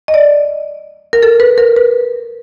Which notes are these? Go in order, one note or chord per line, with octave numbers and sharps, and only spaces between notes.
D#5
D5
A#4
A4
B4
A#4
B4